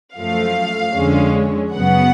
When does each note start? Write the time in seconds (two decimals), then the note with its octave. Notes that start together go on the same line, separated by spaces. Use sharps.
0.17 F#2 F3 A3 F5
0.95 F2 D3 G#3 C#4
1.74 F#2 C#3 F#3 B3 F#5